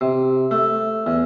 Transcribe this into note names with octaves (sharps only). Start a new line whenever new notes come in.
C3
A3
E2